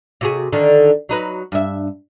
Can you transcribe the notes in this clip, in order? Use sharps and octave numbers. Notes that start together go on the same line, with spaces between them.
C3 F#4 G#4
D3 D#3
F#3 D#4 B4
G2 E5